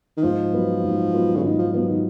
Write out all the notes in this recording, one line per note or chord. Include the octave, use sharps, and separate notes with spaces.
D#3
G#2 F3
F#3 B3 F4 B4
G#2
F#3 B3 F4 B4
C#3
G#2 D#3
F3
F3 F#3 B3 F4 B4
D#3